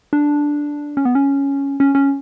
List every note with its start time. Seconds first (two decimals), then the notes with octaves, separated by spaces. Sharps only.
0.13 D4
0.97 C#4
1.05 B3
1.15 C#4
1.80 C#4
1.95 C#4